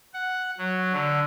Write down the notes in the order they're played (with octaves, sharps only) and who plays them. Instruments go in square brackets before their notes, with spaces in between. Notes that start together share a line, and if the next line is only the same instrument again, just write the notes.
[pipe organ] F#5
F#3
D3